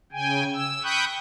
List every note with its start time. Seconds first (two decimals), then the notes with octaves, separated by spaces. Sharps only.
0.12 C#3 G5 G#5
0.53 E6
0.83 G5 B5 C#6 D#6 F#6 G6